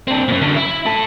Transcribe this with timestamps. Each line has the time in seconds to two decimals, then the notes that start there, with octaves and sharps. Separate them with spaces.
0.08 C4 D4
0.28 F#2 A#2
0.41 F#2 D3
0.56 E4
0.86 E4 A4